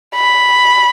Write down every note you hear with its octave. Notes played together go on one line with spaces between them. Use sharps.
B5